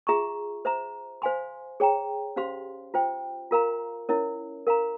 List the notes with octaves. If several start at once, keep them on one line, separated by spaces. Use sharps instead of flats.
F4 G#4 E5 A#5 C#6
C5 E5 A#5
C5 F5 G#5 C6
G#4 C#5 G5 A#5
C#4 G4 C5 F5 C6
F4 C5 E5 G5
F4 A#4 F5 A#5
C#4 E4 A#4 C#5 E5
A#4 F5 A#5